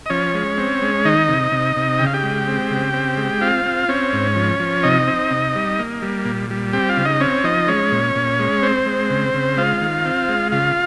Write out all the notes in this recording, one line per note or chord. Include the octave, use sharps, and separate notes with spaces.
D#5
F3 C#4 C#5
G#3
C4
G#3
D#3 D#4 D#5
C3
C3
C3
C#3 G5
F5
G4 G5
G#3
C4
C#3
C4
G#3
C4 F4 F5
C4
C4 C#4 C#5
G#2
F3
F3
C3 D#4 D#5
C4
C3
G3
A#3
G3
A#2
G3
C4 G4 G5
F4 F5
C#3
D#4 D#5
C4 C#4 C#5
F3 D#4 D#5
G#3 C#4 C#5
A#2
A#2
G#3
C4 C5
G#3
C#3
C#3
G#3 F4 F5
D#3
C4
G#3
C#3 F4 F5